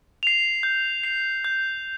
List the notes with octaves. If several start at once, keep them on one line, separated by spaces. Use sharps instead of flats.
C7 F7
G6
C7 F7
G6